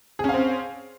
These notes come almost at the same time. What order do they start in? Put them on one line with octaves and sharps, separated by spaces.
G#4 C#4 F5 C4